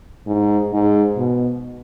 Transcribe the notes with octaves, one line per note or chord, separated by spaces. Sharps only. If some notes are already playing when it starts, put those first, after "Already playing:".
G#2
G#2
B2